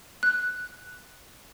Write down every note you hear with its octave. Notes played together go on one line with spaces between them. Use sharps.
F#6